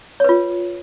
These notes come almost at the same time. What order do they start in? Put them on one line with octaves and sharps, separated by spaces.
C#5 B4 F4